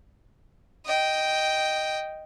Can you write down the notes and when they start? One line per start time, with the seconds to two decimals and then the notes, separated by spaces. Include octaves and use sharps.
0.85 D#5 G5